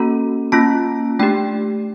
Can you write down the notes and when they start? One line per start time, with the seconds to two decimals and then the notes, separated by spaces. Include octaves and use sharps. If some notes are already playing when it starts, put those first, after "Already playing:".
Already playing: A#3 C#4 F#4 A4 A#5
0.52 A#3 C#4 F4 A5
1.19 A3 D4 G4 G5